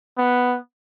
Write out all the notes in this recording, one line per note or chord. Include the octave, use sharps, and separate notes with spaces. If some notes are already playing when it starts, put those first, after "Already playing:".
B3